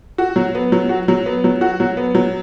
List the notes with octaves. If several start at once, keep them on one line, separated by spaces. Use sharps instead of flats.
F#4
F#3
B3
F#3
F#4
F#3
B3
F#3
F#4
F#3
B3
F#3